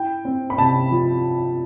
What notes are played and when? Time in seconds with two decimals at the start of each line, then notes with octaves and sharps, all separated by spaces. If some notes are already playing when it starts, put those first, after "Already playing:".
Already playing: E4 G5
0.25 C4
0.50 B5
0.58 C3 A5
0.91 F3